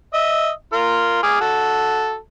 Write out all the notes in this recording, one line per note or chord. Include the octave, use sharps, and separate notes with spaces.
D#5 E5
F4 A#4
G#4 D6 F6
F#4 A4 A5